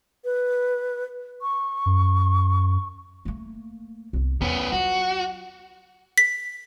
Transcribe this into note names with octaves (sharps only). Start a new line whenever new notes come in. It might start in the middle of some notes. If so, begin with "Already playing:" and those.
B4
C#6
F#2
A3 A#3
C2 B3
E2 B3 C#4
F#3 F4 F#4
B6